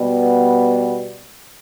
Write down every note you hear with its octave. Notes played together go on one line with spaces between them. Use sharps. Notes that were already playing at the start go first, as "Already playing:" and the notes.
Already playing: B2 G3 B3